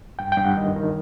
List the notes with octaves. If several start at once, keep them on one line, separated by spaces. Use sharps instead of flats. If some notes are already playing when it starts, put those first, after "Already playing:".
G2 G5
G5
G2
F#5
D#3 D#5
D#3